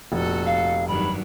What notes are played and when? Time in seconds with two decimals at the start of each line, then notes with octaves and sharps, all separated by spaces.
0.12 F1 A#2 F#4 A4
0.46 F5
0.88 G2 D#3 F#3 B5